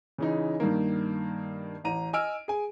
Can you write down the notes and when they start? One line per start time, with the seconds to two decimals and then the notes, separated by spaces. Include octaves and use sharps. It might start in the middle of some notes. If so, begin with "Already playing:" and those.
0.18 C#3 E3 D#4
0.60 G2 D#3 A#3
1.84 A1 A#5 D#7
2.13 D#5 G#5 E6 F6 D7
2.48 G#4 G#5